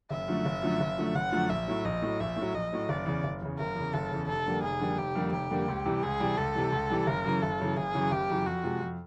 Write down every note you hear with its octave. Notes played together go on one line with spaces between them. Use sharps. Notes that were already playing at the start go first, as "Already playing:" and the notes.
F#1 E5
F#2 D3 F3 A3
F#1
F#2 D3 F3 A3
F#1
F#2 D3 F3 A3
F#1 F#5
F#2 D3 F3 A3
A#1 E5
A2 F#3
A#1 D#5
A2 F#3
A#1 E5
A2 F#3
A#1 D#5
A2 F#3
F#1 D5
E2 C#3
F#1
E2 C#3
F#1 A#4
E2 C#3
F#1 A4
E2 C#3
F1 A4
F2 D3 G3 A#3
F1 G#4
F2 D3 G3 A#3
F1 G4
F2 D3 G3 A#3
F1 G4
F2 D3 G3 A#3
C#2
C3 E3 G3
C#2 G#4
C3 E3 G3
C#2 A4
C3 E3 G3
C#2
C3 E3 G3
F#1 A#4
F#2 C#3 E3
F#1 A4
F#2 C#3 E3
F#1 G#4
F#2 C#3 E3
F#1 G4
F#2 C#3 E3
F2 F#4
C3 F3 G#3
F2